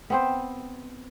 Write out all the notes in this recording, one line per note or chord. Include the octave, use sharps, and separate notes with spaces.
B3 C4 C5